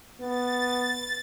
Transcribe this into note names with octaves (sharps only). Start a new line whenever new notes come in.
B3 A6